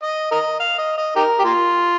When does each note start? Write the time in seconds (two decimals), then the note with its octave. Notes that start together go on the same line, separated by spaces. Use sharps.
0.03 D#5
0.31 A#4 D#5
0.60 F5
0.78 D#5
0.98 D#5
1.16 D#4 G4 A#4
1.39 G4
1.44 A#3 F4